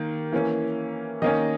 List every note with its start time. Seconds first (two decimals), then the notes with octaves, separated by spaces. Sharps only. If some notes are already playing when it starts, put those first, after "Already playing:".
Already playing: D#3 A#3
0.32 E3 A#3 C#4
1.22 D#3 A#3 C#4 D#5